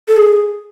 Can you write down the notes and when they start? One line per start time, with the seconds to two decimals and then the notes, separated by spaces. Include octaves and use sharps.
0.08 A4
0.17 G#4